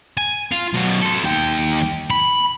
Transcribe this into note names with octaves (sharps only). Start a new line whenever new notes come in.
G#5
F4
F#2 B2
A4 C5
D#2 G5
B5